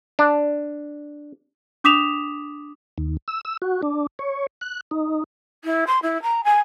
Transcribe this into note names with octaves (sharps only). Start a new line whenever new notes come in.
D4
D4 D6 D#6 B6 E7 F7
D#2
E6
E6
F#4
D4
C#5
F#6
D#4
E4
C6
E4
A#5
G#5